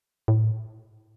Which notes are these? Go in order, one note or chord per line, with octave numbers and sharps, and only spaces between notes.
A2